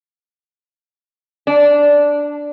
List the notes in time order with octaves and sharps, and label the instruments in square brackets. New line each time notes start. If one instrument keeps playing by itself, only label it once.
[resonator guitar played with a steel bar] D4